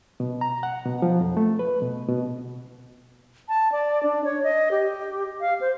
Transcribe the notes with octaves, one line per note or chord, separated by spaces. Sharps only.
B2
A#5
F#5
B2
F3
F2
A3
B4
B2
B2
A5
D5
D4
C#5
D#5
G4
F5
C5